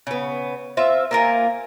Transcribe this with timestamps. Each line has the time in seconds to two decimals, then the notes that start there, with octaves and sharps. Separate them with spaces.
0.07 C#3 B3
0.77 C4 F4 E5
1.11 A#3 F4 A#4 G#5